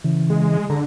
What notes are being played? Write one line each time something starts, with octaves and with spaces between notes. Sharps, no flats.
C#3 E3
G#3
D3 A#5